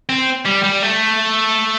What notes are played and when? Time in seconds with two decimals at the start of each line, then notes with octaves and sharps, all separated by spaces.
0.09 C4
0.45 G3
0.63 G3
0.82 A3